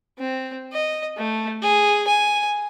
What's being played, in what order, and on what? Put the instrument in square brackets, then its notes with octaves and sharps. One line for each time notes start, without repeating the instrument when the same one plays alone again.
[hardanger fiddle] C4
D#5
A3
G#4
G#5